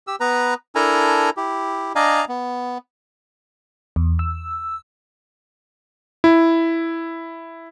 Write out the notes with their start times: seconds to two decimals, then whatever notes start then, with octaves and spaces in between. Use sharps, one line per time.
0.07 G4 E6
0.20 B3 B4 A#5
0.75 D4 E4 A4 A#4 G#5 A#5
1.37 E4 G4
1.95 D4 D5 D#5 F5 G#5 A#5
2.29 B3
3.96 E2
4.19 E6
6.24 E4